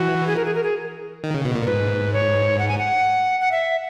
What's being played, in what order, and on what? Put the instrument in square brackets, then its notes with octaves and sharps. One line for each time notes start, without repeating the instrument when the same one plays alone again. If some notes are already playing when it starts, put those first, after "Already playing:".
Already playing: [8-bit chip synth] E3 [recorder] F#4
[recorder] G#4
A#4
G#4
A#4
G#4
[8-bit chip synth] D#3
C#3
B2
A#2
[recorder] A#4
[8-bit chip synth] G#2 [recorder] B4
[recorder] C#5
F#5
G#5
F#5
F#5
E5